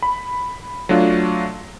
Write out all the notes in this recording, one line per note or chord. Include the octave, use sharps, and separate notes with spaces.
B5
F#3 A3 D4 F4